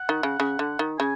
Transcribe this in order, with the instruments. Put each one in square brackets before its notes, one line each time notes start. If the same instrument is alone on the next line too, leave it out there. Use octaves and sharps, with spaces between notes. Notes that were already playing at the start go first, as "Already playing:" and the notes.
Already playing: [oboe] F#5
[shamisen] D#3
C#3
C#3
D3
D#3
[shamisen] C#3 [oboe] G#5